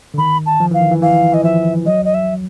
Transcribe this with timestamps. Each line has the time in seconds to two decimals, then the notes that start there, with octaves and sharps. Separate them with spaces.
0.14 D3
0.18 D#3 B5
0.46 A5
0.60 F3
0.71 E3 F5
0.81 D#3
0.91 E3
1.02 E3 F5
1.33 E3 D#5
1.44 F3 E5
1.86 F#3 D#5
2.05 D#5
2.14 E5